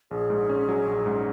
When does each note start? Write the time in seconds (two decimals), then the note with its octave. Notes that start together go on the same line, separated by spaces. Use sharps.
0.11 A#1 G#4
0.30 G#2
0.49 C#4
0.69 F#3
0.87 A#1
1.06 G#2